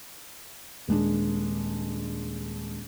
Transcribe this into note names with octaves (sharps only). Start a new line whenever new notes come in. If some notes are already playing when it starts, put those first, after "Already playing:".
D#1 G#3 D4